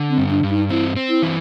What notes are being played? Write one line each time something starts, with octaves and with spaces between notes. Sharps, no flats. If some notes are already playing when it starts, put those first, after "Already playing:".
Already playing: D3
C4
G2
D4
G2
D#4
C4 E4
C4
E4
E3